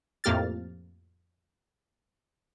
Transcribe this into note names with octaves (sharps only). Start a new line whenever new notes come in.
F2 A2 A#3 G4 F6 A6